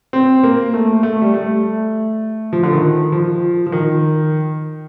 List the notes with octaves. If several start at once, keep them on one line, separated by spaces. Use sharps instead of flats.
C4
A#3
A3
A3
G3
A3
F3
D3
D#3
F3
F3
D#3